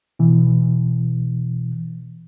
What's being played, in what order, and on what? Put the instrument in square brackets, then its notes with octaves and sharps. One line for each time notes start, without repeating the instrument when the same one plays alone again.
[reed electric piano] B2 E3